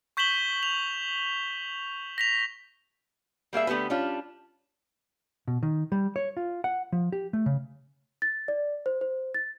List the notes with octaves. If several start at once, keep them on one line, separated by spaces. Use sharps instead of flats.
C#6 G6 B6 E7 F#7 G7
F7
A#6 B6 F7
G3 A#3 G#4 E5
D3 A3 B3 G4 B4
G3 C#4 D4 F4
B2
D#3
G3
C#5
F4
F#5
F3
G4
A3
C#3
A6
D5
C5
C5
A6